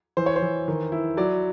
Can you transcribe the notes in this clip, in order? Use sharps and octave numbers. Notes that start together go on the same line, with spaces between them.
E3 C5
C#5
C5
E3
D#3
E4
F#3 D5